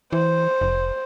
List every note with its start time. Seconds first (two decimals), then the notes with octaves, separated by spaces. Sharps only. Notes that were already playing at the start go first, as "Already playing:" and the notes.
0.13 E3 C5
0.61 F1